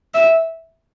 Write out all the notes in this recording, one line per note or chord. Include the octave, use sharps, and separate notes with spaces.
E5